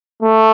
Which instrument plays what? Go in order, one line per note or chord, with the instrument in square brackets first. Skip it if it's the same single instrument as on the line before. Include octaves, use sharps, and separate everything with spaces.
[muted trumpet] A3